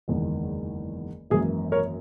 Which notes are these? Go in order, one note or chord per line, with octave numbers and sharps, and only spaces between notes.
F#1 E2 D#3 G#3
G#1 F#2 E3 A#3 G#4
A#4 C#5